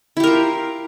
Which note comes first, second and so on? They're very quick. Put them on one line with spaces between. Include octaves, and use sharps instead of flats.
E4 G4 A#4 F4